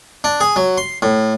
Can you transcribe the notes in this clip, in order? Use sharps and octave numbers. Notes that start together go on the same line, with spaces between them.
D4
G#4
F#3
C6
A2